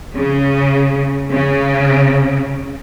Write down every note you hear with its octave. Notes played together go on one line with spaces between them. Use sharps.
C#3
C#3